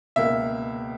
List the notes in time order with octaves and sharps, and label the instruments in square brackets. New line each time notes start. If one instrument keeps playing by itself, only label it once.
[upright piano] C#2 B2 A#3 E5